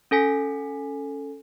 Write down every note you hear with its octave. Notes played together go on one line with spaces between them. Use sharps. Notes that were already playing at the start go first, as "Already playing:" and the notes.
C#4 A4 G#5 B6